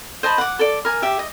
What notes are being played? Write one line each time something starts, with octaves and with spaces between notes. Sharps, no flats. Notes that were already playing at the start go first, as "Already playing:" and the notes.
C5 D#5 A5 B5
F#5 D6
A4 D5
A#4 G#5
G4 E5
D#5